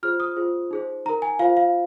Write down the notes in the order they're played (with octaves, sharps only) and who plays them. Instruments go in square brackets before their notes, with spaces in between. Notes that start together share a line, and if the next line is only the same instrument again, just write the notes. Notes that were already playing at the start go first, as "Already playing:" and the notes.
[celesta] F4 G#4 C5 F6
D#6
F4 G#4 C5
D#4 G#4 C5
D#4 A#5
A#4
G#5
F4 C5 F5
F5